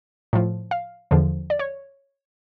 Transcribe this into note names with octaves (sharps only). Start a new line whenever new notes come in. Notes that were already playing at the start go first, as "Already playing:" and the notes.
A2 F3
F5
E2 D3 F3
D5
C#5